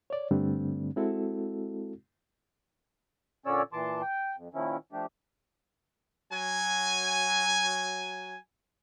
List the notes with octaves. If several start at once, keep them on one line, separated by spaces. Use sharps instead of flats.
C#5 D5
G2 D3 G3 A3 C4 D4
G#3 C4 E4 F#4 A4
A#2 D3 C#4 C#5 D5 E6
A#2 E3 A5 C6 D6
G5
F2
A#2 D#3 F3 C#4 E4
F3 A3 D4 G4
F#3 G#5